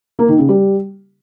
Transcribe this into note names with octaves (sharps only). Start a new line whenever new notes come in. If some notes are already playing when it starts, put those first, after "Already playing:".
A#3
D#3
C#3
G3